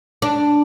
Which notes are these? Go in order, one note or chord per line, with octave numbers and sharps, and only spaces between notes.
D4